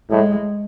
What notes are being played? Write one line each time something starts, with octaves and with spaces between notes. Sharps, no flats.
A2 G#3